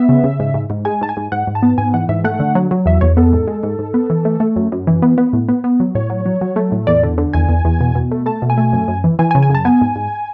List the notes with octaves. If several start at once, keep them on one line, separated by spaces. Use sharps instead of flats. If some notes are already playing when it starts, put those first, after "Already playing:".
Already playing: B3 E5
C#3
C#3
G#2
G#2
G#2
G#3 G#5
G#2 A5
G#5
G#2
G#2 F#5
G#2
A5
B3
G#2 G#5
E3 F#5
G#2 E5
A3 F#5
D3
F#3
F#3
E2 E5
E2 C#5
B3 A4
G#2
G#3
G#2
G#2
B3
E3
A3
A3
F#2
F#2
E3
B3
B3
A2
B3
B3
F#3
A2 C#5
F#3
F#3
F#3
A3
A2
E2 D5
D3
D3
E2 G#5
E2
E2
B2
B2
A3
A3 A5
B2
G#5
A3
F#2
F#2
E3
E3 G#5
G#5
C#3
G#5
F#2
A5
B3 G#5
G#2
G#2